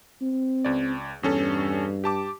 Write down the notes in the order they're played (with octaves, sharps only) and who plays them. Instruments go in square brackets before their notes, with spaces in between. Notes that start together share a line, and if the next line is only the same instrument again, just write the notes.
[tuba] C4
[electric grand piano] C#2 D5
[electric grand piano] E2 C#4 A4 [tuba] G2
[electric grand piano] G4 A5 D6